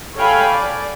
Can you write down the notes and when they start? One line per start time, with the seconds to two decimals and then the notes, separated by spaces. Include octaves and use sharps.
0.16 A4 C#5 F5 G5 G#5 B5
0.50 D5